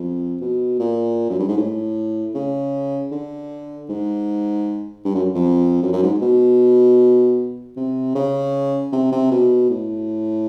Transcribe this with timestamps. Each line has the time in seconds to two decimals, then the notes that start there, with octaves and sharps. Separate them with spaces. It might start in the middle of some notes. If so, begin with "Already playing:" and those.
Already playing: F2
0.41 B2
0.80 A#2
1.30 F#2
1.39 G2
1.48 G#2
1.57 A2
2.35 C#3
3.12 D3
3.89 G#2
5.05 G2
5.15 F#2
5.35 F2
5.83 F#2
5.93 F#2
6.03 G#2
6.22 B2
7.77 C3
8.15 C#3
8.92 C3
9.12 C3
9.31 B2
9.70 A2